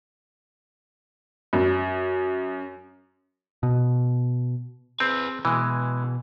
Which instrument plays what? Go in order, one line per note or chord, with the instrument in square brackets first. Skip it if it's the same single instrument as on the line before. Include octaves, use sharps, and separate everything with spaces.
[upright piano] F#2
[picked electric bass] B2
[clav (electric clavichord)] C4 [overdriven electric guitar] G#4 B4
[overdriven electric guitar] B2 [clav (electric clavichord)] E3 G#3